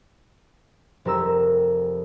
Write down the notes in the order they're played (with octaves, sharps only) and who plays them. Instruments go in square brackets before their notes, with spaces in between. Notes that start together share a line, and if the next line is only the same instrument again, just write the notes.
[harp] F1 C4 G4 A#4 A#5 E6